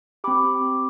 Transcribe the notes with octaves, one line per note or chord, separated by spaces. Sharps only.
C4 G4 B5 D6